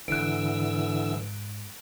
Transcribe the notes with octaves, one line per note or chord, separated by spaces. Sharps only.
G#2 D3 E3 E6 F#6 D7